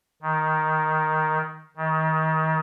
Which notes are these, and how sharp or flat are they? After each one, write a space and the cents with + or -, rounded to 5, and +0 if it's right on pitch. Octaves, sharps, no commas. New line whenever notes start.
D#3 +5
D#3 +30